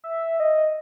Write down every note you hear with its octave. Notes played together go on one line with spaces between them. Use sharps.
E5
D#5